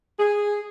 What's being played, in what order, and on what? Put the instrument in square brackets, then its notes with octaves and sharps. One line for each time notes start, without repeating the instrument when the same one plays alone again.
[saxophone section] G#4